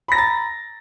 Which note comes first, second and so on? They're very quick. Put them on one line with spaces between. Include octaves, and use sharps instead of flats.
B5 A#6 A#5 A6